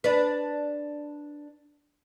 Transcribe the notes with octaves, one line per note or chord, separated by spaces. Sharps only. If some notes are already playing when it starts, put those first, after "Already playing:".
D4 B4